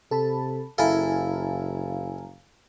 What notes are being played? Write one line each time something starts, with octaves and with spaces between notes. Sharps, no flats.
C3 A4 A5 B5
F#1 E4 A4 F5 G#5 A#5